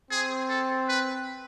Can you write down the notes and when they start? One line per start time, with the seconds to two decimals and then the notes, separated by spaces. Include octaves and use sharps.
0.11 C4 G#4
0.49 A4
0.88 B4